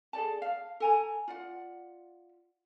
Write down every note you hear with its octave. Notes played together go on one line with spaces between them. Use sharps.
G#4 A4 D5 A5
F5
A4 G#5 A#5
F4 D5 F#5